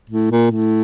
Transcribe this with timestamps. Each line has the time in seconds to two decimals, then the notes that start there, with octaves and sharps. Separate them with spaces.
0.09 A2
0.31 A#2
0.51 A2